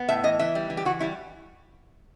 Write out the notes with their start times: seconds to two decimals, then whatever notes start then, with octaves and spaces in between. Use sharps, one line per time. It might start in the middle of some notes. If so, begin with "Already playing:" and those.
Already playing: B3
0.09 A2 E5
0.24 E3 D#5
0.39 E3 E5
0.55 G3
0.70 E3
0.77 G4
0.85 E3 F#4
1.00 G3 E4